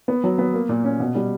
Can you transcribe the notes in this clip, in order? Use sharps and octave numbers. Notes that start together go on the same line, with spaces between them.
B3
F#3
B3
A#3
A#2
C#4
B2
G3